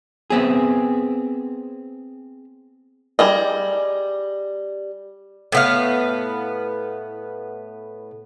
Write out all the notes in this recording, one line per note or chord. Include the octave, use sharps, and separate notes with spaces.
B3 C4 G#4
G3 G#4 D#5
A2 B3 F5